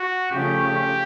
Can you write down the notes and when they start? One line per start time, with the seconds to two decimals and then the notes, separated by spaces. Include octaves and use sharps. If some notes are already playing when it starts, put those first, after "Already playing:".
Already playing: F#4
0.32 C#3 F3 A3 C#4 G4